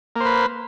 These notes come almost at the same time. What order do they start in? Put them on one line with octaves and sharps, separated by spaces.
A#3 C5 B4